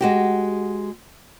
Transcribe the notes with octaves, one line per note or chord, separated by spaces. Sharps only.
G#3 F#4 G4